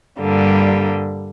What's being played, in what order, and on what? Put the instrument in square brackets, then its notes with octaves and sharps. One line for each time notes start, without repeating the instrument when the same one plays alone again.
[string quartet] G2 D3 G3 A#3